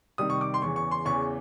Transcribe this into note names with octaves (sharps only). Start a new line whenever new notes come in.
C3 D#3 G3 D#6
C#6
D6
C6
E2 C#3 E3 C#6
C#6
C6
E2 C#3 E3 C#6